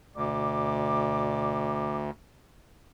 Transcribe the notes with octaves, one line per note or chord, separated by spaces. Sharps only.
D2 B2 D5 D6